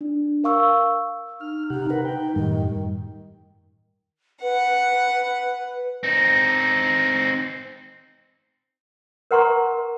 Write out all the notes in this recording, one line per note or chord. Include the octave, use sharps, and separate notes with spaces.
D4
A#4 F5 C#6 E6
D#4 F6
C3 D#4 G4 F#5
D#4 A#4 B4 F#5
D#4 G5
F#2 A2 D#3 G3
B4 F#5
C4 D#4
A#4 B4 F#5 A#5 C6 C#6